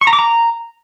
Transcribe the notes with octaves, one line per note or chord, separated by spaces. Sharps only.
C#6
A#5
D6
A#5